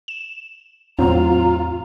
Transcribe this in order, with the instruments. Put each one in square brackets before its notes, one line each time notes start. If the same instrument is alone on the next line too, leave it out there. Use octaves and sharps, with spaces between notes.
[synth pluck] E7
[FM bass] E2 [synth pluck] A2 F#3 C4 [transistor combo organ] F4 [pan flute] A#5